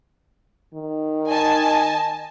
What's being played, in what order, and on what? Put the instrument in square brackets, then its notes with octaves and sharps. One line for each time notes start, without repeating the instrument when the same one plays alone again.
[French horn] D#3
[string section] D#5 G#5 A5